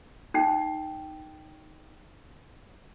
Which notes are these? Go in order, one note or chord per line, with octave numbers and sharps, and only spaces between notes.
D#4 G5